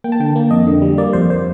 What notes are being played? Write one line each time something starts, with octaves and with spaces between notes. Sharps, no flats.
A#3 G5
A5
D3 G5
A#3
F2 D#5
D3
G3
A#3 D5
F2 C5
C5